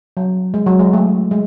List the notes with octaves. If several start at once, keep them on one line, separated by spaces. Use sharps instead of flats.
F#3
G#3
F#3
G#3
A3
G#3